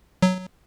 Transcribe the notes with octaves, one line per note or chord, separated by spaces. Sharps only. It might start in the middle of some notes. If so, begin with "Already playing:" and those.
F#3